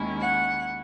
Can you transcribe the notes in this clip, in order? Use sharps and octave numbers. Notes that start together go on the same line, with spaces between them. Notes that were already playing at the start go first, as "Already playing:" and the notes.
Already playing: D#2 D#3 G#3 C#4 E4
F#5